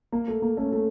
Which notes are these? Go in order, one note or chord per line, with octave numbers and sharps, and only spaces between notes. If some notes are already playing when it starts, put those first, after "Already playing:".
A#3
A3
A#3
A3 C#4
A3